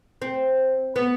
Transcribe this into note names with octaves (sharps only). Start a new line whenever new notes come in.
C4
B3